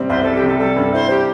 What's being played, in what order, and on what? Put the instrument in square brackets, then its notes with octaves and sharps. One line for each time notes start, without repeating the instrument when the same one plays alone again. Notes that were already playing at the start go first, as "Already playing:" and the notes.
Already playing: [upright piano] C3 G3 C4
[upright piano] C2 [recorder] C5
[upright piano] G3 [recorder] A4
[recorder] G4
[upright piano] C3 [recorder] A4
[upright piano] G3 [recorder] A4
[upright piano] G2 [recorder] A4
[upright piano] E4 [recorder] C5
[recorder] G4